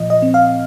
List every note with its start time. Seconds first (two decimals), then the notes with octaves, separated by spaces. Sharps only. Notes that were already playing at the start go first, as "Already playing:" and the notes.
Already playing: A#2 F3 D#5
0.10 D#5
0.22 C4
0.34 F5